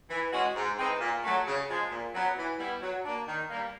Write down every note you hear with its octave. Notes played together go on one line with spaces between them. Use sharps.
E3
G#3 C#4 F#4
G#2
E3 G#3 C4 D#4
A#2
F#3 A3
C#3
F3 G#3
A#2
F#3 B3
E3
G3 B3 E4
F#3
A#3 D4
D#3
G3 A#3